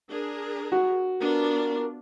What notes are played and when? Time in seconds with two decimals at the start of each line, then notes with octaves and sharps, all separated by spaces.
0.11 D4 G#4 A#4
0.72 F#4
1.22 B3 D4 F4 A#4